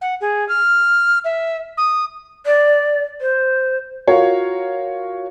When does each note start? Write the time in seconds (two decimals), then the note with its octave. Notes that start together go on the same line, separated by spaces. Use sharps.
0.01 F#5
0.21 G#4
0.49 F6
1.24 E5
1.77 D#6
2.46 D5
3.21 C5
4.07 F4 F#4 A#4 C#5 F5